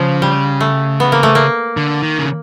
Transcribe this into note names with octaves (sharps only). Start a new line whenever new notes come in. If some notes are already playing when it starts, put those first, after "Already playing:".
Already playing: C#3 F3
G3
A3
B3
A#3
A3
A#3
D3
D#3
C#3